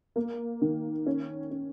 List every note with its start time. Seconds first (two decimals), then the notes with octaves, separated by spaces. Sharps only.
0.16 A#3
0.62 D#3
1.06 C#4
1.51 C#4